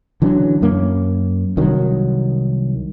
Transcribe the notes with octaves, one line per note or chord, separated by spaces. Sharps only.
D3 E3 F#3 C#4
F#2 A#3 C#4
C2 D#3 F#3